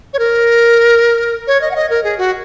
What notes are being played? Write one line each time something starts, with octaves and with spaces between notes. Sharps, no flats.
C#5
A#4
C#5
D#5
F#5
D#5
A#4
G#4
F#4